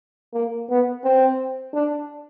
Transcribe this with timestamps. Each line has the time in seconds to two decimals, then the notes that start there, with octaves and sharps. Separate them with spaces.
0.34 A#3
0.69 B3
1.04 C4
1.73 D4